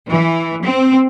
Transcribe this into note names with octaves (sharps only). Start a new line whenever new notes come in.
E3
C4